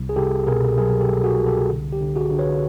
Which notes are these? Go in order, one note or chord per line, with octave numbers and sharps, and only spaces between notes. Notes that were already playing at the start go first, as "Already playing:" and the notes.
Already playing: C2
G#4
C2 G4 A4
B2 G#4 A#4
F#3 G#4 A#4
G4 A4
C2
F#4 G#4
C2
G4 A4
D3
G4
D3
F#4 G#4
D3
B4 C#5